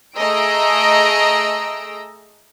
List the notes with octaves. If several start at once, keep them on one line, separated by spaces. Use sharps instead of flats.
A3 G#4 D#5 A#5 E6 D7